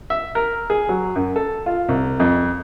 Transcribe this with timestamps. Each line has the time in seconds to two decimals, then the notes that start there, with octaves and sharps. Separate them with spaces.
0.10 E5
0.35 A#4
0.70 G#4
0.89 F#3
1.15 F#2
1.36 A4
1.66 F4
1.89 C2
2.20 F2